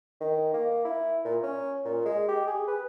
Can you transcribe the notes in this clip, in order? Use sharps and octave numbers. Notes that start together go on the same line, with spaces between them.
D#3
A#3
E4
A#2
C#4
A#2
G#3
G4
G#4
B4